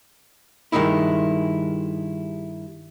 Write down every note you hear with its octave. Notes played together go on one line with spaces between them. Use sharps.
G2 D#3 G#3 D#4 E4